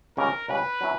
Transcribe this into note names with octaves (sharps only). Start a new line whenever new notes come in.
C#2 C#3 G3 C#4 A#4
C#2 C#3 G3 C#4 B4
F#3 C#4 E4